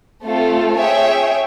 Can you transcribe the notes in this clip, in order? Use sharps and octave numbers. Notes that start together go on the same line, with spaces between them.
A3 C4 F4 A4
G#4 C#5 E5 G5